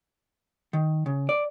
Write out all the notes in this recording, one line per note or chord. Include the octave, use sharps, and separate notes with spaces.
D#3
C#3
D5